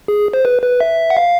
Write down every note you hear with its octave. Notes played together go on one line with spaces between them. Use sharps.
G#4
C5
B4
B4
E5
F#5
F5